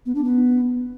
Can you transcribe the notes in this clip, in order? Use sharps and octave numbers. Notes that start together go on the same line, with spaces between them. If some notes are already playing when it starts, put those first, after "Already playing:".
B3
D4
B3